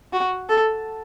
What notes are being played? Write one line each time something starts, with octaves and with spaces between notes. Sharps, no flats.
F#4
A4